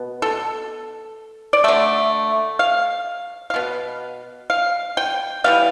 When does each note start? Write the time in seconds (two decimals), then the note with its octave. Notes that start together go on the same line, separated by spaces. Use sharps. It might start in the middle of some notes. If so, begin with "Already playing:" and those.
Already playing: B2 B3
0.22 A4
1.53 D5
1.64 D3 A3 E5
2.59 F5
3.50 F5
3.54 B2 B3
4.50 F5
4.97 G5
5.44 E3 G3 B3 F5